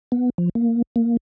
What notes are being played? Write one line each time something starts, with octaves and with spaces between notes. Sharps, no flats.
B3
F3
A#3
A#3